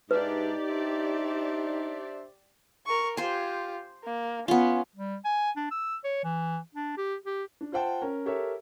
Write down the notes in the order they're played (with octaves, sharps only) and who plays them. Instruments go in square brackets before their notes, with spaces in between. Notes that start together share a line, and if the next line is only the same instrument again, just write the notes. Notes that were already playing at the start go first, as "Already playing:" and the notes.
[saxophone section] G#2 D4 E5 [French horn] D#4 [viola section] G4 D5 [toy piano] B4
[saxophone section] D4 C5 E5
[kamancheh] A#4 C#6
[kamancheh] F4 G4 [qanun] C5 G#5
[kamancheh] A#3
[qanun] B3 F4 [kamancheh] C#4
[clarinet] G3
G#5
D4
E6
C#5
E3
D4
G4
G4
[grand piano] D4
F4 C5 F#5 G5 A5
C#4 A#4
G4 A4 A#4 C#5 E5